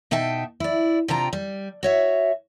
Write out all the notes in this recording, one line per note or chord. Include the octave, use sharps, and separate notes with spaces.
B2 D#4 E5 G5 A5
E4 D5
C3 D4 F4 G5 A#5
G3
F#4 C#5 E5